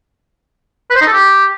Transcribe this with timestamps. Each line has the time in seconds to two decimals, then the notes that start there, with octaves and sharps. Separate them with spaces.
0.90 B4
0.96 C5
1.01 D#4
1.07 A4
1.13 G4